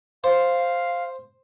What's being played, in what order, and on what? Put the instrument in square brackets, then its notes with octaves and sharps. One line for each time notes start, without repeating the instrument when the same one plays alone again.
[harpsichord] C5 [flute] F5